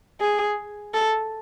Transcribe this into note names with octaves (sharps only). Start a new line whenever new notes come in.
G#4
A4